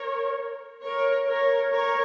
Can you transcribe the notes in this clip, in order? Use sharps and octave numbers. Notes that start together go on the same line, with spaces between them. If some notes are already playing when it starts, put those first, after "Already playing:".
Already playing: A#4 C#5
A#4 C#5
A#4 C#5
A#4 C#5